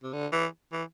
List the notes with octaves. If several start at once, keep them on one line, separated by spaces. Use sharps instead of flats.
C3
D3
E3
E3